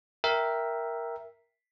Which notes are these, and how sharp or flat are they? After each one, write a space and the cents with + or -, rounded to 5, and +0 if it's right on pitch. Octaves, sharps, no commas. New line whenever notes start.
A#4 +5 E5 +0 G5 +0